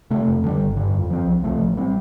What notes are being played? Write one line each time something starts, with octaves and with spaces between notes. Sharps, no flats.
C3 A3
F2
D3 G3
G1
G2 D3
F2
F3 C4
C2
C3 F3 A3
A1
G3 C4